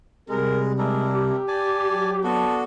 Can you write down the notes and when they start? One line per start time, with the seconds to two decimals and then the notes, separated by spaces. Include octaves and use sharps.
0.29 C3 G3 G#3 A#4
0.78 G#3 D4 E4 A#4
1.13 G4
1.48 D5 G#5 A5
1.89 F#3
2.24 B3 D4 F#4 A4